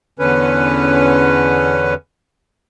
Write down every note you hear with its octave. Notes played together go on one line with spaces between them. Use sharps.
E2 D3 C#4 B4